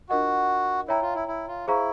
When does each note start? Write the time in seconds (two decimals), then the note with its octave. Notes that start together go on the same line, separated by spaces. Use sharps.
0.09 D4 F4 F#4 A#4 D#5 F#5
0.88 E4 C#5 E5 G5 A#5
1.02 F4
1.15 E4
1.28 E4
1.48 F4
1.67 E4 G#4 C5 F5 A#5 C#6